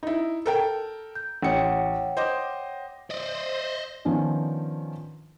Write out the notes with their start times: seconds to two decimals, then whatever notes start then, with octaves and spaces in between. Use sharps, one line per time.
0.03 D#4 E4
0.46 A4 A#4 G5
1.15 G6
1.43 A1 C#5 F#5 G5 C#7
2.17 C5 D#5 D6
3.10 C5 D5 D#5
4.05 D#3 F3 B3 C#4 D4